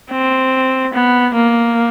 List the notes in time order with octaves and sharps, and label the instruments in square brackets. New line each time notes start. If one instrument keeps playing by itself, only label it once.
[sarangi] C4
B3
A#3